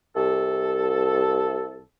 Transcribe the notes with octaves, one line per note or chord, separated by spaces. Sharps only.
C2 A4